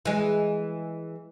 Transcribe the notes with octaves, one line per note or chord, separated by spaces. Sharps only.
E3 G#3